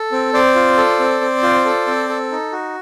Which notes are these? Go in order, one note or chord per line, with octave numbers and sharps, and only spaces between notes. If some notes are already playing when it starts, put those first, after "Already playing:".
Already playing: A4
C4
C4 C5 D5
F4
A4
C4
C4
F4
A4
C4
A4
D#4
F#4